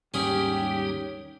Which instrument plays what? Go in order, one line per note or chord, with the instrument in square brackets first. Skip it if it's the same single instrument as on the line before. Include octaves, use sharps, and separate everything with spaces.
[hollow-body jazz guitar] D#2 G#2 [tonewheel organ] G3 D#4 [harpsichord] C#4 G#4 C#5 [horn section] G4